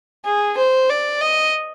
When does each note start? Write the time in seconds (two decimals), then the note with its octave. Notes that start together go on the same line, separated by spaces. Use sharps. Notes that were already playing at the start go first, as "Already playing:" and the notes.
0.25 G#4
0.58 C5
0.90 D5
1.21 D#5